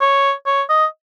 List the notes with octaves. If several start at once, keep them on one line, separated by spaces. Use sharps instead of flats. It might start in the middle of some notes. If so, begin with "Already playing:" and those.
C#5
C#5
D#5